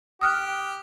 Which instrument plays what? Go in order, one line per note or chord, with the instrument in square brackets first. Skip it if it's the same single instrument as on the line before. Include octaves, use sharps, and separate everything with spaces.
[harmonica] G4 [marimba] D#6 F6 F#6